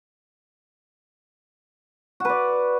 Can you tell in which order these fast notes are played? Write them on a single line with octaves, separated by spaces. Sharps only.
F#4 B4 D5